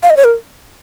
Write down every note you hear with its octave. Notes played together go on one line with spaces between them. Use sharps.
F5
D#5
C#5
A#4